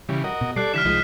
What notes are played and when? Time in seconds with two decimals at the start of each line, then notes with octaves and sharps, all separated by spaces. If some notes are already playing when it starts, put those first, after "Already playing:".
0.09 C#3 E3 G3
0.24 F#4 A#4 D#5
0.41 B2
0.56 G3 A4 D5 F#6 C7
0.74 D3 E3 F6 B6 E7
0.85 C2 F3 G#3 D#4